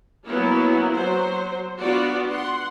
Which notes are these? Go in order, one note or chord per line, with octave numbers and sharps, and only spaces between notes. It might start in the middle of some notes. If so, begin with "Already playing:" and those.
F#3 A#3 B3 C#4 E4
F#3 C5
B3 D4 F4 F#4 D5 F#5
F#5 C6